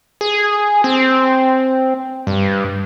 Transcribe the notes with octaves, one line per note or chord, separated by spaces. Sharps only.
G#4
C4
G2